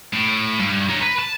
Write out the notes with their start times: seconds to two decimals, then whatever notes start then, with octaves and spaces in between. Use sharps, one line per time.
0.13 A2
0.59 G2
0.89 A#4 C#5
1.01 B4
1.19 A5